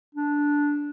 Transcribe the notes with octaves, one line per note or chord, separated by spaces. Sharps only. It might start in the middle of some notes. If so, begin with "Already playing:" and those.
D4